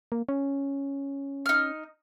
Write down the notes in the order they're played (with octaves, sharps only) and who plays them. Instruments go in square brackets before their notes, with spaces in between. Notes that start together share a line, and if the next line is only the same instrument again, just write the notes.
[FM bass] A#3
C#4
[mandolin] D#4 F6